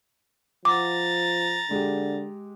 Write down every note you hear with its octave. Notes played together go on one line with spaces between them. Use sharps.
F3 F#5 A#5 D6 A6
D3 G#3 G4